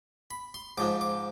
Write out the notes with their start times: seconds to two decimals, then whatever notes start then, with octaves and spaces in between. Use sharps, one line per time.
0.31 B5
0.54 C6
0.78 G#2 F3 G#3 D6
1.01 D6